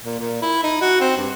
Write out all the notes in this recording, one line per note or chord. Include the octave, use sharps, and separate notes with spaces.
A#2
A#2
E4
D#4
F#4
C4
G2